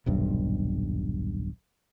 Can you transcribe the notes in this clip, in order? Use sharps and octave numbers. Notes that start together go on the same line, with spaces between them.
D#1 B1 G2